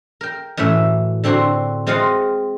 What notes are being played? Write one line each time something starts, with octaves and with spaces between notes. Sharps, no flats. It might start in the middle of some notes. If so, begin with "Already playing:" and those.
A#4 G5
F#2 A2 E3 E5
D3 C4 D4 F#4 C6
G#3 C4 F4 D#5 F5 F#5